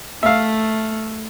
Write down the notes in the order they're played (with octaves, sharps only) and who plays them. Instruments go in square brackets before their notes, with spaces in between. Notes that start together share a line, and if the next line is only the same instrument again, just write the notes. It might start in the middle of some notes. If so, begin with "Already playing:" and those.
[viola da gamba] A3 [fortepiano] E5 F5